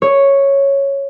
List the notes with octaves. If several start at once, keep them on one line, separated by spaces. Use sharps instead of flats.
C#5